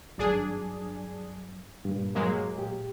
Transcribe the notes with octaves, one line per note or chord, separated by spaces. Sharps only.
G#1 G2 F#3 D4 G#4
G2 A#2
F#3 G#3 A#3
A#2 G4